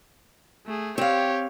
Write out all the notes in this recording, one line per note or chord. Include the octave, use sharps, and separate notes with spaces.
A3 G#4
C4 G4 C#5 F5